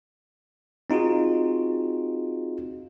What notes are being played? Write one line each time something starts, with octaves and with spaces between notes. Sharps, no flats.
C4 D#4 F4 F#4 G#4